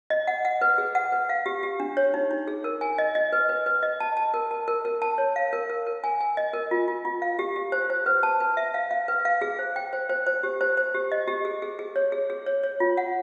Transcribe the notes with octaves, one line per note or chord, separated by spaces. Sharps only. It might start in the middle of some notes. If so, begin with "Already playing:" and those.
D#5
F#5
F#5
B4
G#4
F#5
B4
F5
G4
G4
D4
C#5
D#4
D#4
G#4
A#4
G#5
D#5
D#5
B4
B4
B4
D#5
A5
A5
A#4
A5
A#4
A#4
A5
C#5
F5
A#4
A#4
A#4
G#5
G#5
D#5
A#4
F4
F4
F4
F5
G4
G4
C5
C5
B4
A5
B4
E5
F5
F5
B4
F5
G#4
C5
G5
C5
C5
C5
G4
C5
C5
G4
D#5
G4
G#4
G#4
G#4
C#5
G#4
G#4
C#5
C#5
F4
F#5